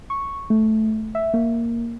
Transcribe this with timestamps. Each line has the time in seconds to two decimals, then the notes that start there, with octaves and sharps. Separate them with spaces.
0.10 C#6
0.50 A3
1.15 E5
1.34 A#3